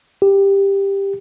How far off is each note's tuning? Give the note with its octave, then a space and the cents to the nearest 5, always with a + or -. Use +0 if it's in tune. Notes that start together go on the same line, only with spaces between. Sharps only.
G4 +10